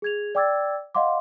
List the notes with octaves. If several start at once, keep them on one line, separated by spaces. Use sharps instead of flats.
G#4 G#6 F7
D5 G5 D6 E6 G#6 A6
D#5 F5 F#5 C6 D6